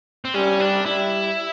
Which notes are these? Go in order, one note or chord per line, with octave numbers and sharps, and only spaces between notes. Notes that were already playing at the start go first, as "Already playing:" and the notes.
C4
G3 C#4
D4
G3 E4